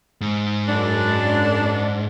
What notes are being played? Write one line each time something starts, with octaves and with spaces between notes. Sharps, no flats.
G#2
F#2 D4